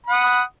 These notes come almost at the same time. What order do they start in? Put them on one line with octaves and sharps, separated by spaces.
B5 F#5 D#6